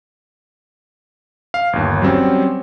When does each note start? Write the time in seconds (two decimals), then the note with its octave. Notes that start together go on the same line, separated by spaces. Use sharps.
1.54 F5
1.73 G1 D#2
2.02 F#3 G3 C4 C#4